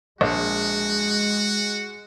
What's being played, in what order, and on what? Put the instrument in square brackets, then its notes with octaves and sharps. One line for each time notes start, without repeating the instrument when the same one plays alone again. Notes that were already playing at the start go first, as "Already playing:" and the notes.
[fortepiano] A#1 [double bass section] G#3 [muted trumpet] F#4